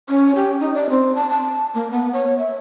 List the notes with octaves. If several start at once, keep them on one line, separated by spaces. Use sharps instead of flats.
C#4
G4
D#4
D5
C4
A5
A5
A#3
B3
C#5
E5